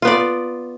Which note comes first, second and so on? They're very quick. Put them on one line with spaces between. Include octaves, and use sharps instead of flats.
F4 B3 D5